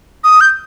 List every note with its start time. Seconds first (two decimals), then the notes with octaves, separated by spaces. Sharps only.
0.24 D#6
0.41 G6